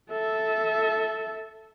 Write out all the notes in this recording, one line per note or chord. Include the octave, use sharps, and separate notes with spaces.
A4 E5